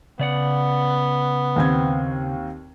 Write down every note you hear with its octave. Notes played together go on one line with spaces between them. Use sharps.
C#3 B3 D5 F#5
D#2 C4 G#6